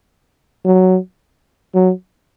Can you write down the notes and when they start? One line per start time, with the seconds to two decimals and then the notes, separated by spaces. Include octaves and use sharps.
0.65 F#3
1.74 F#3